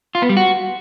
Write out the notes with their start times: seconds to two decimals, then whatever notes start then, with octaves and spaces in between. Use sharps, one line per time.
0.15 F4
0.22 B3
0.29 G3
0.37 F#4